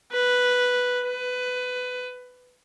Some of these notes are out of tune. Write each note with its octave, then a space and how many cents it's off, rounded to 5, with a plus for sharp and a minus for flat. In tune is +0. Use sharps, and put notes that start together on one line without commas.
B4 +0
B4 +20